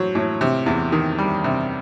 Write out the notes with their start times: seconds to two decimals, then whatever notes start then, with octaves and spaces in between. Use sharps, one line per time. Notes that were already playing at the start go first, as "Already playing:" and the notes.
Already playing: A2 F#3 C5
0.15 A2
0.41 C3
0.66 E2
0.92 D#3
1.19 G3
1.44 C3